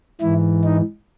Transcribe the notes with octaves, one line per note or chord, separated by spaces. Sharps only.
G#2 E3 E4
D#4